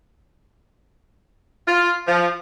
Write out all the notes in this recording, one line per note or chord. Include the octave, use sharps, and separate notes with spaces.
F4
F3